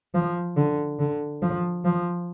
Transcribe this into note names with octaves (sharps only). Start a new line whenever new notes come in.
F3
D3
D3
F3
F3